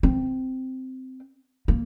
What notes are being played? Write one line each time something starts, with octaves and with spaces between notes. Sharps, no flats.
C4
A#3